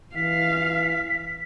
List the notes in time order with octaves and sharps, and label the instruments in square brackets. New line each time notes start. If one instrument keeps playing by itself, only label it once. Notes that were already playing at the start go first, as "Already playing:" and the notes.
[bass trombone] E3 [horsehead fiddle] F5 [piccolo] B6